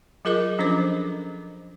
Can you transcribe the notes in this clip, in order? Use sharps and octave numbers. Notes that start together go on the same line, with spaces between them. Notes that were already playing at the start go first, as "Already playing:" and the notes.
F#3 F4 G#4 A#4 D#5 D6
F3 C#4 D4 A4 C5 D6